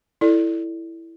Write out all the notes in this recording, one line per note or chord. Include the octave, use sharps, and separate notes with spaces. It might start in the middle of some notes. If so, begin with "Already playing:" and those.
E4 A4 D5